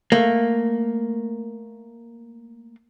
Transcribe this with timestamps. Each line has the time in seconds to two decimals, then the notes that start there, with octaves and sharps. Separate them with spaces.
0.12 A3 A#3